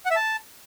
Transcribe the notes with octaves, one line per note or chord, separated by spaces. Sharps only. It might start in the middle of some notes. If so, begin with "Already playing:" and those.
F#5
E5
A5